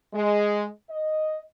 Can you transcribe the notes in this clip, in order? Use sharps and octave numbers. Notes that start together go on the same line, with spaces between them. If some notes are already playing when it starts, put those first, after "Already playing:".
G#3
D#5